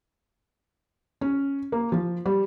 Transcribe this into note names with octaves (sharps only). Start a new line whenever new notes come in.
C#4
A#3
F3
G3